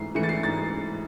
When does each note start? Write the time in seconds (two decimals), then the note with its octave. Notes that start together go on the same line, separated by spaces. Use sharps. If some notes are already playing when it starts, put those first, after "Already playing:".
Already playing: G#2 E3 A3 C7
0.15 E3 A3 C#7
0.23 A6
0.29 C7
0.43 G#2 A6